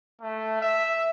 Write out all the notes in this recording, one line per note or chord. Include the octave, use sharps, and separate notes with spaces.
A3
E5